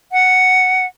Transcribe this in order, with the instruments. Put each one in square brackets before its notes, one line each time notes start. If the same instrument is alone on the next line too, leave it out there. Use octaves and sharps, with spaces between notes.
[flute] F#5